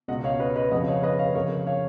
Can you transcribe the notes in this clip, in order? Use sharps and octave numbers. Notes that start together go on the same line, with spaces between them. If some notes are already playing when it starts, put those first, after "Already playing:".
C#2 B2 D#5 F#5
C#5 F5
B4 D#5
B4 D#5
F2 C#3 D#5 F#5
C#5 F5
B4 D#5
C#5 F5
F2 C#3 A#4 C#5
C#5 F5